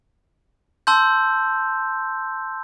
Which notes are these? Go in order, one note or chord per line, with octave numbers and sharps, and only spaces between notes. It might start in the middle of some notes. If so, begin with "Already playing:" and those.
A5 C6 E6 G6